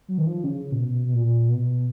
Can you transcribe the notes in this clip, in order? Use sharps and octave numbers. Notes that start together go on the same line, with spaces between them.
F#3
D#3
F3
C#3
A#2
B2
B2
A#2
B2